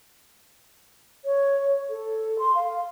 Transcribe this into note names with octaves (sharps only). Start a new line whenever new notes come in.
C#5
A4
C6
F5